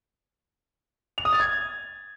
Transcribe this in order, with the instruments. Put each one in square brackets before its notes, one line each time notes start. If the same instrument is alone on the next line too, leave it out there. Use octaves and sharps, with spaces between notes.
[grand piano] F7
D#6
A6
G#6